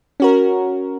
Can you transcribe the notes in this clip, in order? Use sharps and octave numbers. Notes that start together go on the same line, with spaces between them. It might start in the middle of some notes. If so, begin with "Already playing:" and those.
C#4 F#4 A#4